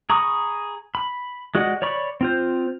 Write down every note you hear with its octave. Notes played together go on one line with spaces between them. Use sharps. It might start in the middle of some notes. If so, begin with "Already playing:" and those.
G#4 A#5 B5 C#6 D#6
B5
G#3 F#4 D5 D#5 F#5
C#5 D5 B5 C#6
C4 F4 C5